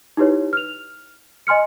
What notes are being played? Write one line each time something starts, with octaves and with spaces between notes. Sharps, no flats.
D#4 E4 G4 B4 C#5
F6 F7
D#5 G#5 C6 F6 C#7